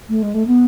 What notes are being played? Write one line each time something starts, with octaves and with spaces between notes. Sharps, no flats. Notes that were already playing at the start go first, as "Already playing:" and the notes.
A3
G#3
A3
B3